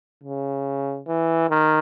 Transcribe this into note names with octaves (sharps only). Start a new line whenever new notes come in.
C#3
E3
D#3